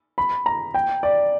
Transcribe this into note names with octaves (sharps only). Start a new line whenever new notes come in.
B5
A#5
G5
D5